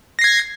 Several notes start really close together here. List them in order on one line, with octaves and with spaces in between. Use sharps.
A#6 C7 G#6